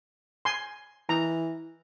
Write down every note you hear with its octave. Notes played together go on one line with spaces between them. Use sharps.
G#5 C6
E3 A#5